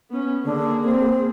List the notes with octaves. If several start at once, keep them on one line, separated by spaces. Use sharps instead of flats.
B3 C#4
D3 A#3 G#4
C4